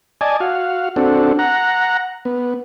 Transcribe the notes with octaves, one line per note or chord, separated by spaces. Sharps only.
D5 D#5 G#5 A5
F#4 F5
C4 D4 F#4 A4
F#5 A#5
B3